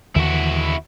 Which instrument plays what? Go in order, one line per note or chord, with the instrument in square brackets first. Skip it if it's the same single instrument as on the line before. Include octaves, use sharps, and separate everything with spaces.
[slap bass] D#2 D3 E3 [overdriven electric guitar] E4 F#4